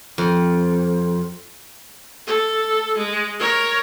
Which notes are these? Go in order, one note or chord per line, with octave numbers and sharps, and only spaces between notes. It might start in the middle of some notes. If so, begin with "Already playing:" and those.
F2
A4
G#3
A#4 C#5